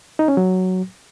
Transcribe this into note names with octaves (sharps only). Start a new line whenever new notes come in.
D#4
C#4
F#3